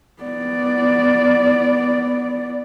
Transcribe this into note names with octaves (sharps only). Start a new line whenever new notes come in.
B3 D5